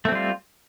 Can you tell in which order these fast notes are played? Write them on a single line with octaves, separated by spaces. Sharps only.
A3 C4 G3 F4